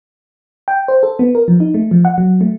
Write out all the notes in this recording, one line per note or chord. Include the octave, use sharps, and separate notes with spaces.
G5
C5
A4
B3
A#4
F3
D#4
A3
F3
F#5
F#3
A3